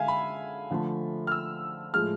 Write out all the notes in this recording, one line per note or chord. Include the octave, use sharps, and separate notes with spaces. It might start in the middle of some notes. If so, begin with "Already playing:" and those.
Already playing: D3 G#3 E5 F5 G#5
B5
D3 F3 A3
F6
E6
A2 F3 G#3 F6